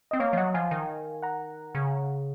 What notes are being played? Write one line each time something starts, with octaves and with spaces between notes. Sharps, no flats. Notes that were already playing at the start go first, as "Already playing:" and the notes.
C4 D#5
A#3 C#5 F5
F3
F#3 D#5 F#5
F3 F5 G#5
D#3
F#5 A#5
C#3